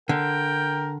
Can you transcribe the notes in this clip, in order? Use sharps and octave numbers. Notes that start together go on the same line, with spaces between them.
D3 A#4 G5